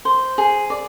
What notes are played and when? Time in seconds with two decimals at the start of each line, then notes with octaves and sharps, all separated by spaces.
0.05 C5
0.38 G#4
0.70 D5